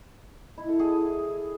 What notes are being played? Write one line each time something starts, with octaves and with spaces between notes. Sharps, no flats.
E4
A4
G#4